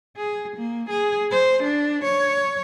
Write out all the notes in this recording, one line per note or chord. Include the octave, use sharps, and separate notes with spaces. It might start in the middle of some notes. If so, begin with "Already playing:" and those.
G#4
A#3
G#4
C5
D4
C#5